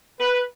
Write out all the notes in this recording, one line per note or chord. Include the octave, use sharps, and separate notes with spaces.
B4